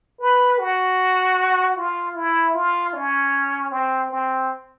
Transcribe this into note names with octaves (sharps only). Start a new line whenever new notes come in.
B4
F#4
F4
E4
F4
C#4
C4
C4